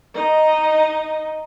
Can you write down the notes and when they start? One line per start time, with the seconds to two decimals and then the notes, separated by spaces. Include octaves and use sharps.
0.14 D#4 D#5